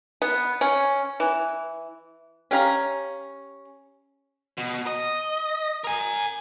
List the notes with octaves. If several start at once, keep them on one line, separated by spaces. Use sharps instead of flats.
B3
C#4
E3
C#4 G4 F5 A#5
B2
D#5
A#4 G#5